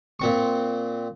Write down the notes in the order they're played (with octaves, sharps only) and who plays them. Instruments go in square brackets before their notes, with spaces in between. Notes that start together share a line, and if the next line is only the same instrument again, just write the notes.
[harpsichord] A#2 C4 C#6